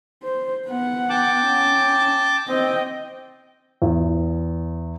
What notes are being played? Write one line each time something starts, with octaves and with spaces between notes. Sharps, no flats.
C5
B3 F#5
G5 A5 D6
C#4
C4 D#5 G5
E2